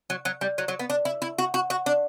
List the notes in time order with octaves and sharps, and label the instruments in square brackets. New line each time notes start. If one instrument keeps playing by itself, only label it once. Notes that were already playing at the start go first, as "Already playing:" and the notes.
[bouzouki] F#3
F#3
G3
F#3
F#3
B3
D4
E4
E4
F#4
F#4
F#4
D4